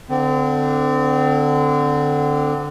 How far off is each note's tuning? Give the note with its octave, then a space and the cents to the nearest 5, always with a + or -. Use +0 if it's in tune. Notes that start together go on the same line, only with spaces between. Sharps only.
D3 +0 C4 -30